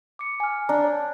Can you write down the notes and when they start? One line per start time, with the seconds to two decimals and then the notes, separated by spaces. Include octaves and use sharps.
0.19 D6 C#7
0.40 G#5 F6
0.69 D4 A#5
0.84 C#5